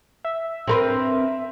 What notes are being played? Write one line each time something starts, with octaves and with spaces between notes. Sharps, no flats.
E5
C4 A#4 B4